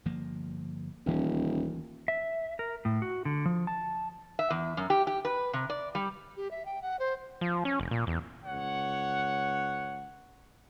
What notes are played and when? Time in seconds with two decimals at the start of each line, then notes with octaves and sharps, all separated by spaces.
0.05 G1 F3 A#3
1.06 D#1 D2 E3 C#4
2.08 E5
2.59 A#4
2.85 A2
3.02 F#4
3.25 D3
3.45 F3
3.67 A5
4.39 E5
4.50 E2
4.77 F#2
4.90 G4
5.07 G4
5.25 B4
5.53 C3
5.70 D5
5.95 G3
6.37 G4
6.51 E5
6.66 G5
6.82 F#5
6.99 C5
7.41 F3
7.65 C#4
7.80 F1
7.91 A#2
8.07 E2
8.44 C#2 C#5 F#5